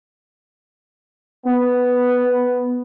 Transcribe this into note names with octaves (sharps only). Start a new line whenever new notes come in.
B3